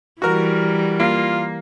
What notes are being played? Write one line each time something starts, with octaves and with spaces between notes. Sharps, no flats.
E3 G3 F#4 A#4
A#3 F4